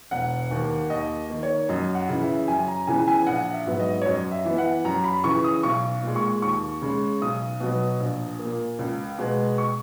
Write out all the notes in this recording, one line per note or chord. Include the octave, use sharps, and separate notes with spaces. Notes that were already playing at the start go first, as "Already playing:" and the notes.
E1 F#5
D#2 D#3 A#3
D#2 D#5
D#3 A#3
C#5
F#2 D#5
F#5
C#3 E3
E5
F#2 G#5
A#5
C#3 E3 B3 G#5
G#5
A#1 F#5
E5
G#2 F#3 B3
D#5
C#5
F#2 D#5
E5
E3 B3
F#5
F#2 A#5
B5
C#3 E3 C#6
D#6
B1 C#6
A#2 G#3
C#6
D#2 C#6
C#3 G#3
B1 D#6
B2 F#3 B3
A#1
A#3
A#2
C#2
B2 G#3 B3
C#6